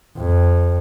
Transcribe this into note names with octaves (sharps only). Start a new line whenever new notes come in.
F2